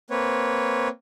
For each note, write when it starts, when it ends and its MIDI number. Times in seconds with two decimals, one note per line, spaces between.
0.10 0.88 58
0.10 0.88 60
0.10 0.88 71
0.10 0.88 73